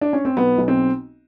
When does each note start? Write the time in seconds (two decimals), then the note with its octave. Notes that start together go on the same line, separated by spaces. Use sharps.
0.01 D4
0.13 C#4
0.25 C4
0.37 B1 B3
0.57 B1
0.68 C4